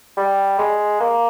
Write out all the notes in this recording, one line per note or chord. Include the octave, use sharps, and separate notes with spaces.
G3
G#3
A#3